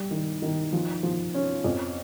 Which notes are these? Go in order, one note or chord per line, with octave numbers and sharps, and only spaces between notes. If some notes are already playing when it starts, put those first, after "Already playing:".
Already playing: G3
D#3
D#3
F3
F3
C#4
F2